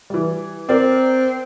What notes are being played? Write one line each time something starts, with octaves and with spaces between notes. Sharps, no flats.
E3 G3
C4 A#4 D5